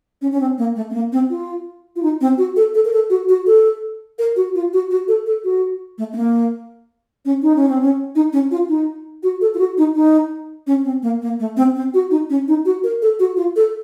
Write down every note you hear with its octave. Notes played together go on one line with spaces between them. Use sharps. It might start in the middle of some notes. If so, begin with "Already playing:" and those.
C#4
C#4
C4
A#3
A3
C4
A#3
C4
F4
F4
D#4
C4
F#4
A4
A4
A#4
A4
F#4
F#4
A4
A#4
F#4
F4
F#4
F#4
A4
A4
F#4
A3
C4
A#3
C#4
D#4
C#4
C4
C#4
D#4
C#4
F4
D#4
F#4
A4
F4
F#4
D#4
D#4
C#4
C4
A#3
A#3
A3
C4
C4
F#4
D#4
C#4
D#4
F#4
A#4
A4
F#4
F4
A4